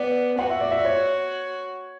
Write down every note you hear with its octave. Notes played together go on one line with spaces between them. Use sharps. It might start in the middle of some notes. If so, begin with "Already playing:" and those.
Already playing: B3 D5
F#4 F#5
E5
D5
E5
C#5